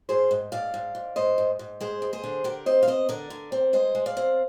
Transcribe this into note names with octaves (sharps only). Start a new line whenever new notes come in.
G#2 G#4 C5
G#2
G#2 D5 F5
G#2
G#2
G#2 C5 D#5
G#2
G#2
G#3 G#4 C5
G#3
G#4 C5
D3
D3 G4 A#4
C4 C5 D#5
F5
C4 C5 D#5
D3 A#4 D5
D3
C4
G#3 C5 D#5
G#3
D5 F5
C4